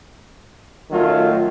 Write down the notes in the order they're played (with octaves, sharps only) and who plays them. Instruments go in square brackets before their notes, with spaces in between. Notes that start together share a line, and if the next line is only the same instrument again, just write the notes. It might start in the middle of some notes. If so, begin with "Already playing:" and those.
[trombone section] D#3 F#3 A3 C#4 F4